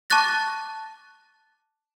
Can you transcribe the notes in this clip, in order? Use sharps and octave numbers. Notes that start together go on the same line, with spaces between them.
A5 C#6 D6 F#6 A6 A#6